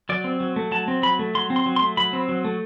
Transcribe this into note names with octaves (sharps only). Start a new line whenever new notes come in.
F#3 D5
C4
F#3
A3
F#3 A5
C4
F#3 B5
A3
F#3 C6
C4
C6
F#3
C6
A3
F#3 B5
C4
F#3
A3